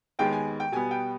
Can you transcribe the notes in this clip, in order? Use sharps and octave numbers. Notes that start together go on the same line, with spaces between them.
D#2 D#3 G#3 B3 G5
G#5
G5
B2 G3 B3 G#5
G5